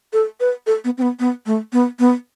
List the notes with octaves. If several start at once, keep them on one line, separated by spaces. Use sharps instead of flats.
A4
B4
A4
B3
C4
B3
B3
A3
B3
B3